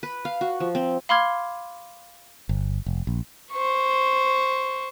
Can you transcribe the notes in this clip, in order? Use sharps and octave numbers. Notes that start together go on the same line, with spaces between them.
B4
F5
F#4
F3
C4
F5 B5 C6 D6 F6 G#6
G1
F1
A#1
C5 C#6